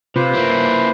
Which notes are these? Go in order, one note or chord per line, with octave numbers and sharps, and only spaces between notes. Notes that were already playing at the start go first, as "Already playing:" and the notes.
C3 F4 B4 C5
A#3 E4